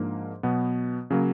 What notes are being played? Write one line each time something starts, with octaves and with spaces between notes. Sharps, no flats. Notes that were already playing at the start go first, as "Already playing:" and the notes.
Already playing: G#2 F3 A#3 D4
B2 F#3 B3
C#3 F#3 A#3